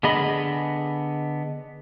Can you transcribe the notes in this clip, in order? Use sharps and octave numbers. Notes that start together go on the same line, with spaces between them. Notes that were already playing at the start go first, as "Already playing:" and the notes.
D3 B3 G#4 D#5 B5